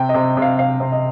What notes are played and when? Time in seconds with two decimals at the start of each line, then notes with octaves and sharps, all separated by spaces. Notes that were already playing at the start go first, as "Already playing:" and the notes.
Already playing: C3 G5
0.09 D#5
0.14 C3
0.37 C3
0.42 F5
0.59 C3 F5
0.80 C3
0.92 D#5